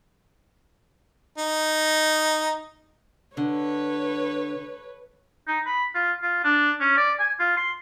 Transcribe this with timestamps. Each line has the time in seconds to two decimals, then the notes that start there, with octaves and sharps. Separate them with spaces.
1.38 D#4
3.37 D3 B4 C#5
5.48 D#4
5.66 B5
5.95 F4
6.23 F4
6.44 D4
6.81 C#4
6.97 D5
7.20 G#5
7.40 F4
7.57 C6